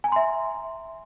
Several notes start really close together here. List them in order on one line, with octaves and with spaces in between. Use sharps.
G#5 A#5 C6 E5